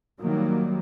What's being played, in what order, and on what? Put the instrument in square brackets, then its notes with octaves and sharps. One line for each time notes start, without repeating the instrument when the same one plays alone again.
[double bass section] D#3 F#3 G3 A#3